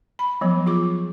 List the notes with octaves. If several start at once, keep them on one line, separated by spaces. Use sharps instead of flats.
B5
F3 F#3 B3
F4 G#4 D6